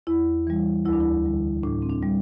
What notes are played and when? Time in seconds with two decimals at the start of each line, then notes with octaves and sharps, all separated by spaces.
0.07 E2 E4
0.47 E3 G3
0.85 D2 E4
0.93 D4
1.00 E4
1.24 D3 G3
1.63 A2 D4
1.82 C4
1.90 D4
2.03 G3